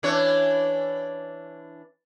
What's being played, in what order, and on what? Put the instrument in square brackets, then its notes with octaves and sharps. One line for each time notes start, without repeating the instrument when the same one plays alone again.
[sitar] E3 D4 C#5